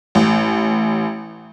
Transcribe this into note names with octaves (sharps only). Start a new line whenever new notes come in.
A1